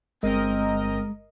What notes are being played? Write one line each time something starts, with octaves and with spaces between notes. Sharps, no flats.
G1 G#3 C4 A#4 D#5